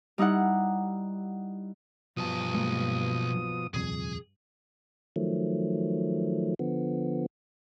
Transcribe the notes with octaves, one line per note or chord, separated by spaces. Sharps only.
G3 D#4 E4 F#5
B1 G2 B2 F3 A5 D#6
G#3 A#3
D#1 C2 F2 G#4
D#3 F3 F#3 A3
D3 F3 B3